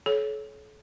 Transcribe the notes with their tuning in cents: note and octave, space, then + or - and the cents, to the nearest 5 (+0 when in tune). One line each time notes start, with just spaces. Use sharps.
A4 -40 C#5 +0